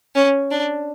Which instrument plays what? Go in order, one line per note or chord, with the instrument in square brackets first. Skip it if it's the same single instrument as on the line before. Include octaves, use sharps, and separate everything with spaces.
[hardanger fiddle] C#4
D4